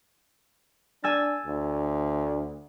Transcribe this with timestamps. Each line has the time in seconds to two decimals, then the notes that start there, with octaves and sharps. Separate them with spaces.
1.04 D4 G#5 E6 A6
1.46 D2